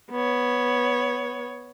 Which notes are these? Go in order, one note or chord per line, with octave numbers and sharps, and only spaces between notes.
B3 C#5